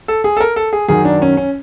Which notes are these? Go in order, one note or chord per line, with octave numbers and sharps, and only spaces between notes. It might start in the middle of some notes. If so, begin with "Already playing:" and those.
A4
G#4
A4
A#4
A4
G#4
F#2 D#3 F#3 G#4
D4
C#4
C#4